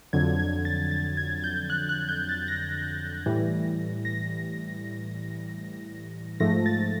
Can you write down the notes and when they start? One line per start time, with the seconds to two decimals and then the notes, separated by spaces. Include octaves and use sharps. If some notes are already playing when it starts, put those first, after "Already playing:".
0.13 F2 D3 F#3 G#6
0.39 G#6
0.65 A6
0.91 A6
1.17 G#6
1.44 G6
1.70 F#6
1.89 F#6
2.09 G6
2.29 A6
2.48 A#6
3.26 A2 E3 G3
4.05 A#6
6.40 G#2 F3 A3 A#6
6.66 A6